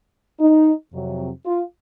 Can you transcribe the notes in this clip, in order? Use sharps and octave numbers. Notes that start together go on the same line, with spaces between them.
D#4
F2 C3 F#3
F4